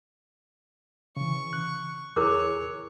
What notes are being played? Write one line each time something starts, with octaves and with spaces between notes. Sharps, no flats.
C#3 E3 C#6
F#6
E2 E4 G#4 A#4 C#5 D6 F#6